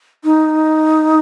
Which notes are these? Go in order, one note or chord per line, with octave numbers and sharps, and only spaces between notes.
D#4